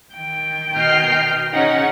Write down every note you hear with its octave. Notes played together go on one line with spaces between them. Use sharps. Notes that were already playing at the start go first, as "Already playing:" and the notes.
D#3 G5
B2 D#5 F6 G6 C7
C#3 C#4 D#4 F#5